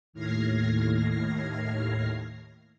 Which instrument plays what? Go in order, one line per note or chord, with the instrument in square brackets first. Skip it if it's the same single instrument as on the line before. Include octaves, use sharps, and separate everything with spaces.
[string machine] D#2 A2 F6 G#6 A#6 C7